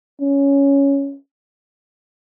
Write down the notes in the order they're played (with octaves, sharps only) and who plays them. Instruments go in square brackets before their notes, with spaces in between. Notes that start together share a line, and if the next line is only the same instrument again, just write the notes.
[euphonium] C#4